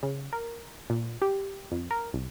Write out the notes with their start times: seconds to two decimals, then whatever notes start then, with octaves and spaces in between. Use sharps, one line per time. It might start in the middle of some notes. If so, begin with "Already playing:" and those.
0.03 C#3
0.33 A#4
0.90 A#2
1.22 G4
1.72 F2
1.91 A#4
2.13 C2